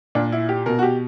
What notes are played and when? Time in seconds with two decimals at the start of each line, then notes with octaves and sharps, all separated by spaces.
0.15 A#2 D4
0.32 E4
0.49 G4
0.66 B2 A#4
0.79 F#4
0.83 G4